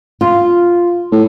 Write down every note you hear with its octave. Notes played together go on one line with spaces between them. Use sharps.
F4
A2